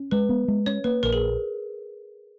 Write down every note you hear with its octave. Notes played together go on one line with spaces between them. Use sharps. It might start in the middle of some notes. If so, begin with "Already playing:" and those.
Already playing: C#4
G#3 B4
B3
G#3
C#4 C#5
A#3 B4
A#1 A#4
G#4